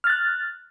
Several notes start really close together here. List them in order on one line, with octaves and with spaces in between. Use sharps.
F6 A6 F#6